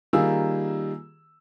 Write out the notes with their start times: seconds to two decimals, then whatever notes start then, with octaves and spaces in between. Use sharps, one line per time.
0.13 D#3 G3 A#3 F4 G#4 E6